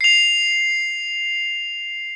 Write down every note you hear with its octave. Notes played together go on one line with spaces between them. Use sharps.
C7 F7